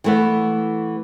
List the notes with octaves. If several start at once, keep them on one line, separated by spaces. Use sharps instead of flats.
E3 A3 B3